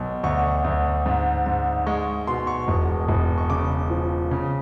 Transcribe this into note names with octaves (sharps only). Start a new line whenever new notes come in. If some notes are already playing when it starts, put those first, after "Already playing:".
Already playing: B1
D2 C#6
D2
G#2
G#2
G#3 C#6
B2 C6
C#6
E1
E1
C#6
C#3 D6
F3
C#3